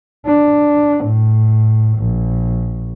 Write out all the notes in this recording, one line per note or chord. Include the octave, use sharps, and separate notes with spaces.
D4
A2
A#1